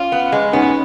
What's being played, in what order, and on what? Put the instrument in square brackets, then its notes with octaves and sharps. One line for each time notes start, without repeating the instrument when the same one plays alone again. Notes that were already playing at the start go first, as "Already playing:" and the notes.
Already playing: [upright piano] C#4 [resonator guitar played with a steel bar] F4
[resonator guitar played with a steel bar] B3
G#3
[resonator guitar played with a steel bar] B3 [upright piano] C#4 D#4